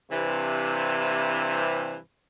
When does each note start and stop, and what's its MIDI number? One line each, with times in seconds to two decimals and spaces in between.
0.11 1.95 43
0.11 1.95 48
0.11 1.95 52